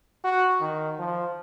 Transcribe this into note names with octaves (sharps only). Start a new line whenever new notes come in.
F#4
D#3
F3